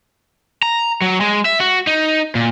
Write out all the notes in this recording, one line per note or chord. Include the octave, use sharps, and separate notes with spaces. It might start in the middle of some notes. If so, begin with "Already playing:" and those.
A#5
F#3
G#3
E5
F#4
D#4
A#2